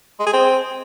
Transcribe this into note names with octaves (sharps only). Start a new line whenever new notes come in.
G#3
G#4
C4